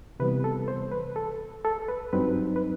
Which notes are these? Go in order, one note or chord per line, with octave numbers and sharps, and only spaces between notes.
C3 E3 G3 B3 B4
A4
C5
B4
A4
A4
B4
G2 F#3 C4 D#4 B4
B4